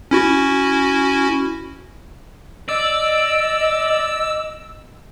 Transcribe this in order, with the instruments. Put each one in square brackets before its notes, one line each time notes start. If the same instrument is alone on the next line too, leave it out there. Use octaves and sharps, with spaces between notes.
[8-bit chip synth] C#4 E4 F#4
[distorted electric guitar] D5 [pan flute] D#5 [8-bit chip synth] E6